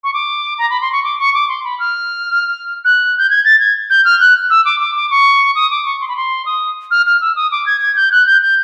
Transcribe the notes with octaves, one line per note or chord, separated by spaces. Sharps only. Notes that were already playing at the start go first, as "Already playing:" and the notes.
C#6
D6
A#5
B5
C6
C#6
D6
C#6
D6
C6
B5
F6
F#6
G6
G#6
A6
G#6
G6
F6
F#6
E6
D6
D6
D6
C#6
D#6
D6
C#6
C6
B5
C6
D#6
F6
F6
E6
D#6
D6
G#6
G#6
G6
F#6
G6
G6